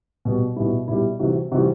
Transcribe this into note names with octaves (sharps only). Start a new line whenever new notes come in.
B2 G3
B2 G3 E4
B2 G3 E4
C3 E3 G3 F#4
C3 E3 G3 F#4